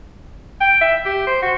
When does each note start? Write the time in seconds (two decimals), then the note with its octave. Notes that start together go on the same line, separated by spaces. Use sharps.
0.61 G5
0.81 E5
1.06 G4
1.27 C5
1.42 F#4